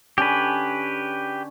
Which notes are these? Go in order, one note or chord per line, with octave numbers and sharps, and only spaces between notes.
D3 C#4 G4 G#4 B4